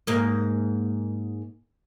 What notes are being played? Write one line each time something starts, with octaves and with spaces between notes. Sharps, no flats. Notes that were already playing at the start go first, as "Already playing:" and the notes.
G#2 A#3